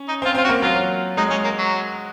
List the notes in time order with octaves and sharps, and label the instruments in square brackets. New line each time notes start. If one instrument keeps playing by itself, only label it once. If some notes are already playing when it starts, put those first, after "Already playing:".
Already playing: [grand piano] C#4
[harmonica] D#4
[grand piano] C4 [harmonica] F4
[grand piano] C4 [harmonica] F4
[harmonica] F#4
[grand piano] A#3
[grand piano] F#3 [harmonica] F4
[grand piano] G#3 [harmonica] D#4
[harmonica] C#4
A#3
F#3